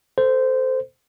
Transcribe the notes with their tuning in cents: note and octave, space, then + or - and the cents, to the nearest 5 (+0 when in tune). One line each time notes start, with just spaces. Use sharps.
A4 +10 C5 -15